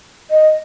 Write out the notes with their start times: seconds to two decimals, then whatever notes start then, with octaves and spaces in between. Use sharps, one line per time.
0.31 D#5